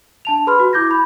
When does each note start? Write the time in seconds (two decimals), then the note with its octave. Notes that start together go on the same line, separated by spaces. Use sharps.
0.25 D4 A5 F7
0.47 G#4 B4 B5 C6 F6
0.59 F#4
0.73 E4 D6 G6 G#6 A#6
0.91 B5